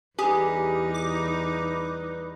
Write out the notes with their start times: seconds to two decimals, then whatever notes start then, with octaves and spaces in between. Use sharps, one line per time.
0.19 E2 G3 D#4 G4 G#4 B4
0.94 D6